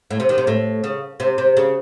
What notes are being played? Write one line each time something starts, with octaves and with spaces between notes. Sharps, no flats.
A2
C3
D#3
C3
A2
C#3
C3
C3
C#3